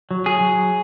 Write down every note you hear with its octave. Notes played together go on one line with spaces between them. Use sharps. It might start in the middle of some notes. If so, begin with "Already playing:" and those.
F#3
G#4
F#3